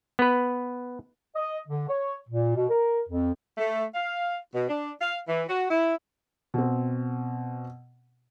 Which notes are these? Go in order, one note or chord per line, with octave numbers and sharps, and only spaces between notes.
B3 B4
D#5
D3
C#5
A#2
B2
A#4
F2
A3
F5
B2
D4
F5
E3
F#4
E4
B2 C4